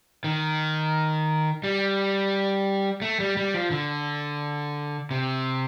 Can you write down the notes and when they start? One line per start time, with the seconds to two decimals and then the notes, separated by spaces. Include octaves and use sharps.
0.24 D#3
1.64 G3
3.02 A3
3.20 G3
3.37 G3
3.54 F3
3.71 D3
5.11 C3